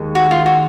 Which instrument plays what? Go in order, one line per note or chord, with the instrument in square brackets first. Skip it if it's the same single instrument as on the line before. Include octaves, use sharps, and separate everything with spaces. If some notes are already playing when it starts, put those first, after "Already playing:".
Already playing: [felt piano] D#2 D#3 G#3
[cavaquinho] F#4
F4
F#4